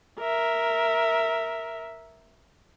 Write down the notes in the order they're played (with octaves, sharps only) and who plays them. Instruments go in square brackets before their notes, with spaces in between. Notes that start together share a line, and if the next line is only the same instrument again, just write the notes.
[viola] A#4 E5